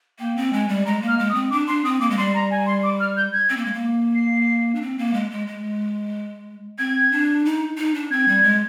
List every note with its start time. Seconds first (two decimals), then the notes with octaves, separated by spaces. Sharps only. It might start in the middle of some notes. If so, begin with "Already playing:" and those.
0.19 A#3 G5
0.36 C4
0.53 G#3 G#5
0.69 G3
0.86 G#3 A#5
1.02 A#3
1.08 F6
1.19 G#3
1.30 D#6
1.34 C4
1.51 D4 D6
1.67 D4 C6
1.85 C4 D#6
2.00 A#3 D6
2.10 G#3
2.18 G3 C6
2.34 A#5
2.51 G#5
2.66 C6
2.83 D6
3.00 F6
3.17 G6
3.33 G#6
3.50 C4
3.57 A#3
3.66 G#3
3.74 A#3
4.15 C7
4.75 D4
4.82 C4
4.98 A#3
5.14 G#3
5.31 G#3
5.47 G#3
6.79 C4 G#6
7.12 D4
7.45 D#4
7.78 D#4
7.94 D4
8.11 C4 G#6
8.28 G3
8.43 G#3